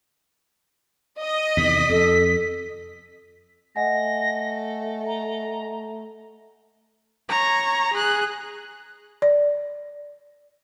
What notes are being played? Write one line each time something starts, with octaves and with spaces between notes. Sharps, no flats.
D#5
E2 C3 D#3 B6
F2 A4
A3 D#5 F#5 G#5 A#6
A#5
C#5 A#5
G#4 F#6
D5